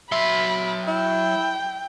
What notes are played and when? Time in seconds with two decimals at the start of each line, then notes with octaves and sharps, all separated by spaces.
0.12 F#3 E5 B5 C6
0.87 E4 G5